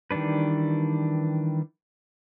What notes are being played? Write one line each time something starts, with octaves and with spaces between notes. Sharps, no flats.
D#3 E3 G3 D4 B4